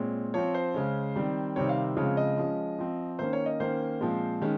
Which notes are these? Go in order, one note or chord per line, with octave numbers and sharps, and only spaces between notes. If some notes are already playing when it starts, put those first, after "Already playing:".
Already playing: A#2 G#3 C4 C#5
F3 C4 C#5
C5
C#3 G#3 C#4
D#3 G3 C4
C3 D#3 G3 C4 C#5
F5
C#3 F3 G#3 C4 C#5
D#5
F3 G#3 C#4
F3 C4
D#3 A#3 C#4 C5
C#5
D#5
D#3 A#3 C#4 C5
A#2 F3 G#3 C4
D#3 G#3 C#4